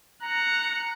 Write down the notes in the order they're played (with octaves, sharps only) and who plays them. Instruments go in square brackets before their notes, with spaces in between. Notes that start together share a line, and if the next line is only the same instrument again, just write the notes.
[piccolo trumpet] A#5 [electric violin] F#6 C#7